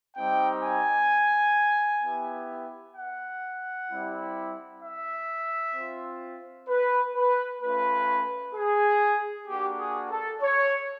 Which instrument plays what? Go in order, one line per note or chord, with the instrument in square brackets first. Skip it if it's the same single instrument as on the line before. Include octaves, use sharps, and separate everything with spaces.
[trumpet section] G3 C4 D#4 G4 G5
G#5
B3 E4 G4
F#5
G3 C4 E4 G4
E5
C4 F4
B4
B4
A3 C#4 F4 B4
G#4
A#3 D4 F#4 G4
G#4
A4
C#5